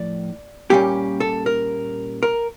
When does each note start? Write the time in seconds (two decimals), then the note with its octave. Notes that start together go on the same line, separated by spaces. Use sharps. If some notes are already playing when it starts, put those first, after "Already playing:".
Already playing: A2 F3 D5
0.70 A#2 G3 A#3 C#4 G4
1.20 A4
1.46 A#4
2.23 A#4